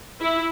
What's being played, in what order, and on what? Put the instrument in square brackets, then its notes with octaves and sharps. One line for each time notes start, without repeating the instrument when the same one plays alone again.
[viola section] E4